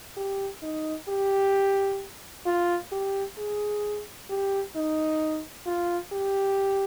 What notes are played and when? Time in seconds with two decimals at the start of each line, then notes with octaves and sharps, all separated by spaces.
0.17 G4
0.63 D#4
1.09 G4
2.46 F4
2.92 G4
3.38 G#4
4.30 G4
4.76 D#4
5.67 F4
6.13 G4